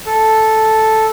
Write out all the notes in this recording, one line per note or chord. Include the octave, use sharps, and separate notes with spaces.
A4